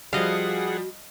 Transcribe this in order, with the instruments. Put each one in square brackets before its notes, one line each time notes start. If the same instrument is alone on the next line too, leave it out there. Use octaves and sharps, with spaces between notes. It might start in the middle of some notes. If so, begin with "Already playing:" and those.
[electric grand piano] F3 G3 [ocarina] F#4 [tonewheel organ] G#4 F#5 [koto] D#5 F5